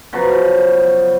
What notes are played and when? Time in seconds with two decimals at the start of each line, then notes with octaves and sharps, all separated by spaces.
0.13 C#3 F3 F#3 B3